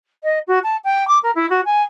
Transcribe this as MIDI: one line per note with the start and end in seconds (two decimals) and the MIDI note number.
0.23 0.39 75
0.47 0.59 66
0.63 0.76 81
0.84 1.07 79
1.07 1.18 86
1.23 1.31 70
1.35 1.48 64
1.50 1.61 66
1.65 1.82 80